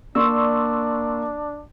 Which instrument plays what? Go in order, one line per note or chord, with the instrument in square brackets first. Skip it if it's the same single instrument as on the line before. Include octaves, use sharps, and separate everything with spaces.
[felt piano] A#3 D5 [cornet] D4 [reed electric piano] C6 C#6 E6